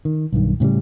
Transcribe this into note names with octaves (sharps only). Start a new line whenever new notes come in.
D#3
B1 G2 D#3
A2 C#3 F3 G3